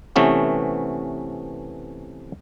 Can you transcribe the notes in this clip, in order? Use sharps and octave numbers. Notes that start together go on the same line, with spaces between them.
C3 E3 A3 B3 C#4